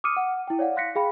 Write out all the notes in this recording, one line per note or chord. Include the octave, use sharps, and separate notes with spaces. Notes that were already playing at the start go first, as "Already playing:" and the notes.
D6 D#6 F6 C#7 D#7
F#5
E4 G5
C#5 D5 F5 F#5
F5 C6 F#6 A#6 B6 C#7
G#4 F5 G5 B5